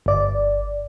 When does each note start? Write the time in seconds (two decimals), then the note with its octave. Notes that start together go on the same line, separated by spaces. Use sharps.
0.06 G1 D5